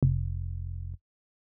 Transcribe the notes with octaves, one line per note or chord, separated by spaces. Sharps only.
F1